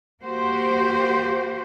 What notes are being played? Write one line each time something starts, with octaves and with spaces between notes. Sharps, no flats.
A#3 F#4 G4 C5